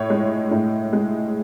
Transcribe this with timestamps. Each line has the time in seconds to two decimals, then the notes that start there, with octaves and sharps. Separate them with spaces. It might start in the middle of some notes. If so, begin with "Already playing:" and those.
Already playing: A2 C#5
0.10 G#3
0.51 A2
0.93 G#3